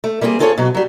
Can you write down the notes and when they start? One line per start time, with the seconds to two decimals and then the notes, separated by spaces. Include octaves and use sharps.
0.04 A3
0.21 G3 A#3 C4 F4 G#4
0.40 C4 F4 G#4 A4 C5 C#5
0.58 B2 F#3
0.75 F#3 G3